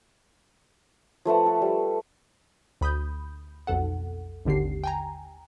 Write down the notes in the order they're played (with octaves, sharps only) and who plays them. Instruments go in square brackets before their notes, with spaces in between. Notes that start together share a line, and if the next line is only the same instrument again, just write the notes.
[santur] F3 A3 B4 F#5
A4
G3
[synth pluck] D2 B5 D#6 G6
B1 F2 A4 F#5
G#1 D#2 D3 G4 C7
G5 G#5 A#5